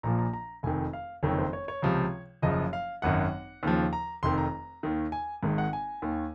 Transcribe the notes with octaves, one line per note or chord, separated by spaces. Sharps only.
A#1 A#2 F3 A#5
A#5
A#5
F1 F2 D#3 G#5
F5
F#1 F2 D#3 C#5
C5
C#5
C#5
C#2 C3 F3
F#1 F#2 C#3 F3 D#5
F5
G#1 F#2 D#3 F#5
D#2 C#3 F3
A#5
F1 F2 D#3 C6
A#5
D#2 D#3
G#5
G#1 G#2 D#3
F#5
G#5
D#2 D#3